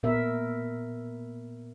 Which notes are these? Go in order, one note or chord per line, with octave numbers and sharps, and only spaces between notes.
A#2 B3 A#4 E5